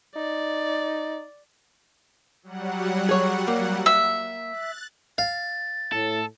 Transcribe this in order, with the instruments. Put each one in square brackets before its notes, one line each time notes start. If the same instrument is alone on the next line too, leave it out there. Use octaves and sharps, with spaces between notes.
[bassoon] D#4 [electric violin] D5
[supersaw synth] F#3 G3 F#5
[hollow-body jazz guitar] G#4 C#5
A#3
[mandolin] E5
[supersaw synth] F#6 A6
[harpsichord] F5 [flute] A6
[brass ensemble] A2 [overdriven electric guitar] A4